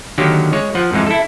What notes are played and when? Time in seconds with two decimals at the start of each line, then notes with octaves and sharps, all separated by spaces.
0.18 D3 D#3 F#3 A#3 G4
0.53 G#3 C#5
0.75 F3 F#5
0.92 F2 G#2 E3 G#3
1.06 E4 A4